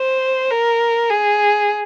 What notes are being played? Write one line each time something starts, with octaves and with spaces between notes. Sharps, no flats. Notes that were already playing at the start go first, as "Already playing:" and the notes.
Already playing: C5
A#4
G#4